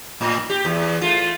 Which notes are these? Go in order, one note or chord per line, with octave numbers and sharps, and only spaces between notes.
A2
G4
E2
A3 F4